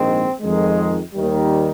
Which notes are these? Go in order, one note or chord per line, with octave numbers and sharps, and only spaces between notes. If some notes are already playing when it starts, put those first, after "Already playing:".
Already playing: A#1 G#2 D#3 G#3 C4
F2 D#3 G#3
D#2 D#3 G3